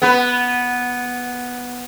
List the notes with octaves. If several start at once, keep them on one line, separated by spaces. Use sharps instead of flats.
B3 B4